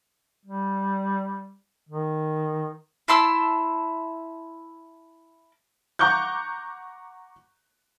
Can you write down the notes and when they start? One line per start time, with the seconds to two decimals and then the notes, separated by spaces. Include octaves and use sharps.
0.45 G3
1.89 D#3
3.08 E4 A5 C6 E6
5.99 F#5 A#5 C#6 D6 F#6 G6